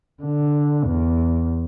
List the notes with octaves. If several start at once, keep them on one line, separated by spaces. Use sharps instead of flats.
D3
E2